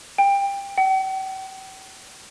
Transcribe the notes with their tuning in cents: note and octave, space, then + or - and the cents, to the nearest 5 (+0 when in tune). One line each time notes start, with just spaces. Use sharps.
G5 +25
G5 -45